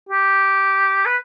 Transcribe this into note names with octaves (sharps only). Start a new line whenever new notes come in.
G4
B4